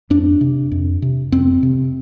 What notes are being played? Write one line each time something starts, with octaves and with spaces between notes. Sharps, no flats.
F2 D4
C3
F2
C3
F2 C4
C3